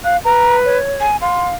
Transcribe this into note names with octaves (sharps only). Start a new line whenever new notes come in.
F5 F#6
B4 A#5
C#5
G#5
F5 C6